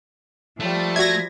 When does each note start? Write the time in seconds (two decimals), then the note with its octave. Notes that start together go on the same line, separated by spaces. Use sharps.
0.60 F3 G3 A3
0.96 F#4 D5 E5 G#6 A#6